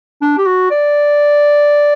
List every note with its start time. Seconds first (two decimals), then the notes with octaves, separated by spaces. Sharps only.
0.22 D4
0.38 G4
0.46 F#4
0.71 D5